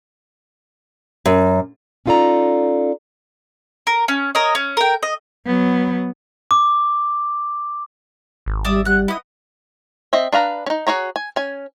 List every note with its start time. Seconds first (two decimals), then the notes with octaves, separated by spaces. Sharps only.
1.26 F#2
2.06 C#4 D#4 F4 A4 D5 A#5
3.87 A#4
4.08 C#4
4.35 A#4 C#5 D#5
4.55 C#4
4.77 A#4 G5
5.03 D#5
5.46 F#3 B3
6.51 D6
8.46 G#1
8.65 G3 D5 E5 D#6
8.85 G3 F#5 F#6
9.08 B3 E4 D#5 D#6
10.13 C4 D#5 E5
10.32 D4 B4 F5 A#5
10.66 C#4 D#4
10.87 F#4 G#4 C#5 A#5
11.16 G#5
11.36 C#4 G#5